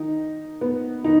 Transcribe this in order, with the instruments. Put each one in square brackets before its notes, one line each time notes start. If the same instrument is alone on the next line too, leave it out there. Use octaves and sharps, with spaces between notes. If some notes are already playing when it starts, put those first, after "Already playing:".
Already playing: [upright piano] D#3 D#4
B3
D#3 D#4